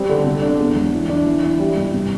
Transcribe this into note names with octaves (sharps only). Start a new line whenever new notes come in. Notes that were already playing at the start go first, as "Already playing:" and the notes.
Already playing: G3 C4
D3
C3
D4
E2
E1
E3
D4
E3
E4
G3
G2
C3